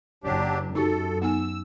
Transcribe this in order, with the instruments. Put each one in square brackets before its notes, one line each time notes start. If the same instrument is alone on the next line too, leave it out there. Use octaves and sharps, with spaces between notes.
[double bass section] F#1 [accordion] F#3 D4 G4
[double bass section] F#2 [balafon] D#4 F#4 G4 [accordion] A4
[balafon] B3 D#4 G#5 [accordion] E6